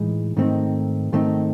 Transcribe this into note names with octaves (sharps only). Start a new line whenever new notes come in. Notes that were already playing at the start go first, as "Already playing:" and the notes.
Already playing: A2 E3 G#3 D#4
G#2 D#3 A3 C4 D#4
G#2 D#3 A3 C4 D#4